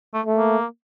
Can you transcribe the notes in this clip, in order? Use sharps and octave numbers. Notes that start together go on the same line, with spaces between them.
A3
A3
A#3